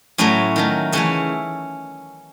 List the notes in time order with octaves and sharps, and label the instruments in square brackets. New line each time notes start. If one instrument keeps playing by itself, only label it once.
[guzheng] A2 F#3 A3 C#4
D#3 F#3 A3
C#3 E3 A3 C#4